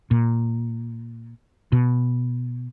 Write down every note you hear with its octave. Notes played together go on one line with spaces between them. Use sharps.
A#2
B2